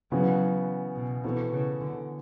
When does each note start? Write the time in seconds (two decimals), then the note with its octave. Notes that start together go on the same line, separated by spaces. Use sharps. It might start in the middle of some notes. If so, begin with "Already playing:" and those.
0.12 C#3 E3 F#3 B3 F#4
0.96 B2
1.24 B2 E3 B3 F#4 A4
1.52 C#3
1.81 D3